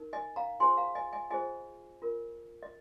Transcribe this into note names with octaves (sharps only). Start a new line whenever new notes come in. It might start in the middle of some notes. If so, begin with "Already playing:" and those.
Already playing: D#4 A#4
D#5 G#5
F5 A#5
F4 G#4 C5 G#5 C6
F5 A#5
D#5 G#5
D#5 G#5
F4 G#4 C5 D#5 G#5
F4 A#4
D#5